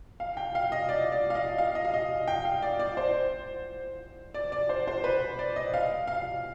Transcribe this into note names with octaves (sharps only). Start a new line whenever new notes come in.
F5
G5
F5
D#5
D5
D5
F5
D#5
F5
D#5
F5
D#5
G5
F5
D5
D5
C5
D5
D5
C5
C5
B4
D5
D#5
F5
F5